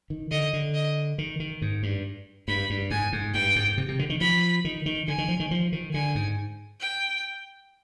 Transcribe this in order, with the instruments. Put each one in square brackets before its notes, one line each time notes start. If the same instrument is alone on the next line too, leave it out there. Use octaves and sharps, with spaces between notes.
[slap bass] D#3
[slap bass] D3 [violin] D#5
[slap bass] D3
[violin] D#5
[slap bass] D#3
D#3
G#2
G2
[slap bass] G2 [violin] B5
[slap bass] G2
[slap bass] G#2 [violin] G#5
[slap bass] G#2
[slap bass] G2 [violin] G5
[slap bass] G#2
C3
C3
D3
D#3
[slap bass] F3 [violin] B5
[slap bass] D#3
D#3
[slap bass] D3 [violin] G#5
[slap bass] D#3
F3
D#3
F3
D#3
[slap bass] D3 [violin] G#5
[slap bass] G#2
[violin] G5